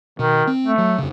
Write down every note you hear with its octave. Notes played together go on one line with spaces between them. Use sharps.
B2 D#3
C4
A3
F#3
F2 C#3